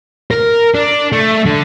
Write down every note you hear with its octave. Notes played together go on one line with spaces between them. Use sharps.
A#4
D4
A3
D3